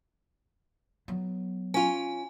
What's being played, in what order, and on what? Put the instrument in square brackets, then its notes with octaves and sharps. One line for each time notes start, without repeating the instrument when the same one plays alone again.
[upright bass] F#3 B3
[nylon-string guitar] C#4 F4 [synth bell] G#5